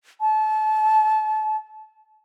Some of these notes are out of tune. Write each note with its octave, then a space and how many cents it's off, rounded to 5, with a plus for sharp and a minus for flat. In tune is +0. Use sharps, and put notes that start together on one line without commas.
A5 -30